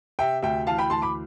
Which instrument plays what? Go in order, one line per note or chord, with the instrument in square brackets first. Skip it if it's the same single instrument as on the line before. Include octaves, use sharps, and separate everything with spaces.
[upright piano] C3 E5 G5
D2 E5 G5
E3 F5 A5
G5 B5
D2 A5 C6
B5 D6